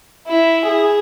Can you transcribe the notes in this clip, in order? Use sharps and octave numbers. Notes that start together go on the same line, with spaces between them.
E4
G#4